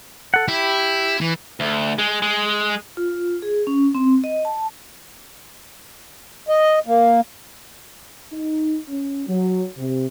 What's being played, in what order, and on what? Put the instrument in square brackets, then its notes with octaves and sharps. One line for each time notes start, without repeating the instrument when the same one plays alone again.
[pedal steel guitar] A4 F#5
[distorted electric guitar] E4 [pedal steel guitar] G4
[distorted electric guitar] E3
[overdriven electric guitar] D2
G#3
G#3
[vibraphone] F4
G#4
C#4
C4
D#5
A5
[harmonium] D#5
A#3
[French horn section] D#4
C#4
F#3
C3